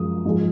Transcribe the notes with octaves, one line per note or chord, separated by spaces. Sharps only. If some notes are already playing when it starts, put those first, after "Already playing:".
Already playing: F#2 F3 G#3 D#6
G#2 F3 G#3